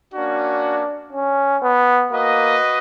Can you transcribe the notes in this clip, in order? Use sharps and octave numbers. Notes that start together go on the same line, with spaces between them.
A#3 C#4 D4 F#4
C#4
B3
A#3 F#4 B4 D#5